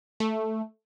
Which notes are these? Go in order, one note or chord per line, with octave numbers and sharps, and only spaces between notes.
A3